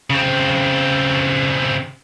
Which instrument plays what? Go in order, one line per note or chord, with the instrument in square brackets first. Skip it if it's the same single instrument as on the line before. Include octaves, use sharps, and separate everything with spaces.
[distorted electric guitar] C#3 C4